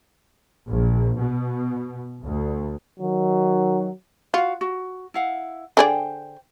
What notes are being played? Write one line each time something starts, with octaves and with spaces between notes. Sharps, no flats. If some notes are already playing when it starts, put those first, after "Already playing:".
A#1
B2
D2
D#3 F#3
F4 F#4 F5
F#4
E4 F5 F#5
D3 G#4 C5 D5 G5